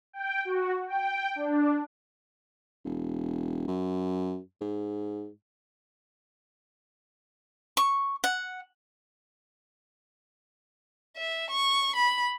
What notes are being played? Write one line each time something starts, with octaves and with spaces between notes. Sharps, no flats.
G5
F#4
G5
D4
E1
F#2
G#2
C#6
F#5
E5
C#6
B5